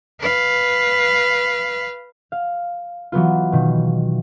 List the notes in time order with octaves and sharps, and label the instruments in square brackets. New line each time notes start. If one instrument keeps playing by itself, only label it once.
[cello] B4 F5
[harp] F5
E3 F#3 B3 F4
B2 D#3